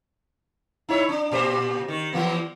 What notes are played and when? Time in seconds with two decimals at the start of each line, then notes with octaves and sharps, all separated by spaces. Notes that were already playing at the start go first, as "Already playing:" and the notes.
0.89 D#4 E4 C#5
1.09 D4
1.32 A#2 G4 C5
1.88 D#3
2.13 E3 A#3 B3